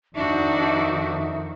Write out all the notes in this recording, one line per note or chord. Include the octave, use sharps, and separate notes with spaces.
F2 D#3 D4 D#4 F#4 E5